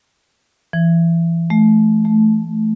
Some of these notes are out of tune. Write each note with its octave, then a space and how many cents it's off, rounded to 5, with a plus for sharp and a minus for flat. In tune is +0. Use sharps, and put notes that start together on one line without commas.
E3 +25
A3 -25
A3 -10